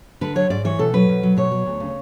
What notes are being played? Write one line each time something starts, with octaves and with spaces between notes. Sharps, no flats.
D3 B4
F#3 C#5
G#2 D5
E3 C#5
B2 A4
F#3 B4
B2
F#3
B2 C#5
F#3
D2
C#3